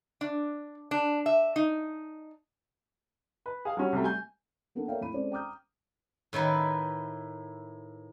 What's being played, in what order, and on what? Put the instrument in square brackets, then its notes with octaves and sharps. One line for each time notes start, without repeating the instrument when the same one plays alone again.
[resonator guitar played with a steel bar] D4
D4
E5
D#4
[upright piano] B4
G#4 F5
F#3 G3 C#4
C2 C3 F#3 G3 A3
G#5 G6
[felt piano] A#3 B3 D4 A4 A#4
A4 A#4 C#5 E5 F5 G5
A2 E4 B5 D#7
G#3 C4 C#4 A4 C5 D5
G5 A#5 D6 D#6 F6 G6
[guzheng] A2 D#3 E4 B4